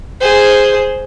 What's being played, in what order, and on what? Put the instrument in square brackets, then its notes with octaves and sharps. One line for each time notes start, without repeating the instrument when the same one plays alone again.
[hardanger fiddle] G#4 C5